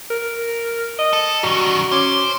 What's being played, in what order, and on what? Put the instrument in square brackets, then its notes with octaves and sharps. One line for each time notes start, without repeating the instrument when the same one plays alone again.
[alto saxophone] A#4
D#5
[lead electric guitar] A4
[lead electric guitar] F#2 D#3 [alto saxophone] G3 [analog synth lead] F#4
[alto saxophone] C#4 [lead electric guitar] C5 [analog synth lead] D6